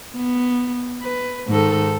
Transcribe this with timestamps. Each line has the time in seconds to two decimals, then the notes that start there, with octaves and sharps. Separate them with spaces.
0.15 B3
1.02 B4
1.49 G#2 D#3 A4